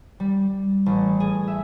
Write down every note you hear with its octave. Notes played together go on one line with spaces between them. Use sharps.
G3
A1
G#4
E5